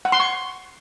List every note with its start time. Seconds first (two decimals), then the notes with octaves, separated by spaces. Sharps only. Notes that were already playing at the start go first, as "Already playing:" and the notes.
0.05 F#5
0.12 C6
0.20 C#6